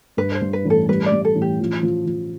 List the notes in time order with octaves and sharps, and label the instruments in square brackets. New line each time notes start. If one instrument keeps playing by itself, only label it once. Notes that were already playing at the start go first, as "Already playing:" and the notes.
[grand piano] G2 [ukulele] B4
[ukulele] C5
[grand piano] G2
[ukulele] B4
[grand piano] A1
[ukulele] A4
[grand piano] G3 [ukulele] B4
[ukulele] D5
[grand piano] G3
[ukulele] A4
[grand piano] A1
[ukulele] G4
[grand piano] F3
F3
F3